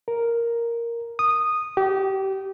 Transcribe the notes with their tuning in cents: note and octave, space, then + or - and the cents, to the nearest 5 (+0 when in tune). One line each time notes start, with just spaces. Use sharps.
A#4 +0
D#6 -10
G4 -25